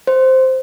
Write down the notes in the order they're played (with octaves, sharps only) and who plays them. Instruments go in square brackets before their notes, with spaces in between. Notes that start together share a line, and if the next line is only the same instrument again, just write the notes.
[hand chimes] C5